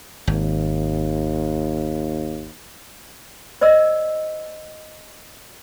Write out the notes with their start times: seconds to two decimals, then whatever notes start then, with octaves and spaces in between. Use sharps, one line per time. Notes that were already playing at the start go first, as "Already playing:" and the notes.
0.27 G#1 D#2
3.61 C5 D5 D#5 E6